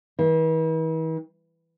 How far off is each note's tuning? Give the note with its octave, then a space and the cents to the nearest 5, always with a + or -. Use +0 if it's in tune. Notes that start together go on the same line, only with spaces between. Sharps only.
E3 -45